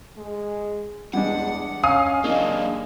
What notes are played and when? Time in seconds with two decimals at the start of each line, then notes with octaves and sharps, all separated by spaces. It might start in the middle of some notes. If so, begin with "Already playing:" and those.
0.18 G#3
1.13 E2 G3 G#3 D4 F#5
1.83 C#4 F5 G#5 D#6
2.24 F#3 G#3 A#3 D4 D#4